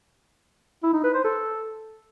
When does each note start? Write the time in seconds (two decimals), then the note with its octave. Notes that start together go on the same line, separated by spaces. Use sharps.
0.83 E4
0.93 D#4
1.04 B4
1.14 C5
1.24 A4